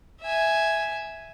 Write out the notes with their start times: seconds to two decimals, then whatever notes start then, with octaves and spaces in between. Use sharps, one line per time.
0.22 E5 G#5